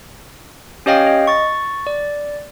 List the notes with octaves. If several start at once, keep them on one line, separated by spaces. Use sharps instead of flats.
C#4 G4 C#5 D#5 F5 G5
D#5
C#6 A6
D5